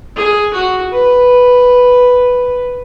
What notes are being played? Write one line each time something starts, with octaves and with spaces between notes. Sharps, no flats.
G#4
F#4
B4